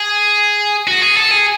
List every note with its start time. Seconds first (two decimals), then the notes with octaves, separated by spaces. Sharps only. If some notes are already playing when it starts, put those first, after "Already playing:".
Already playing: G#4
0.88 F#4
1.02 G#4
1.17 A4
1.31 G#4